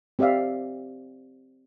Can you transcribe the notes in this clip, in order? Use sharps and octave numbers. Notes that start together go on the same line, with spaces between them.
C4 G4 D5 E5 F5